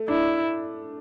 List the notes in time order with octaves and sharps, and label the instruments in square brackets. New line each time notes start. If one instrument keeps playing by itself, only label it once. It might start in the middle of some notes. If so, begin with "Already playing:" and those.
Already playing: [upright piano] A3
[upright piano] D4 [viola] E4